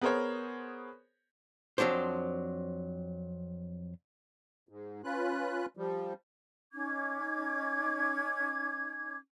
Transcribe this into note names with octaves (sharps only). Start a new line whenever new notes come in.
B3 G#4 A#4 C5 C#5
F2 A#2 F#3 D4 C5
G#2
C#4 F4 B4 F#6
F3 G3
C#4 D#4 D6 G#6